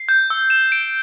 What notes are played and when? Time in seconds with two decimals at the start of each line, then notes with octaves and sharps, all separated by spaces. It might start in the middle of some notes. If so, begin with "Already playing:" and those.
Already playing: C7
0.09 G6
0.30 E6
0.50 E7
0.72 D7